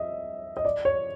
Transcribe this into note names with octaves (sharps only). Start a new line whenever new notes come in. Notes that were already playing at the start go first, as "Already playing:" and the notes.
Already playing: D#5 E5
D#5
D5
C#5